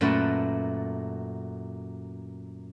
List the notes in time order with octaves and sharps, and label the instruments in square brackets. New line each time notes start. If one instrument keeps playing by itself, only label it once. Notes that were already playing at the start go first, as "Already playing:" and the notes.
[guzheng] F#2 A#2 A3 F#4 B4 E5